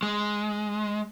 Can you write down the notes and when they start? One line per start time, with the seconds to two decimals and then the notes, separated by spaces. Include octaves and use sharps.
0.03 G#3